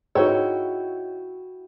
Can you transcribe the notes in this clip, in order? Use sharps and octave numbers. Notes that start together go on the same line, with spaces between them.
G#2 D#4 E4 F#4 G#4 C#5 G5 E6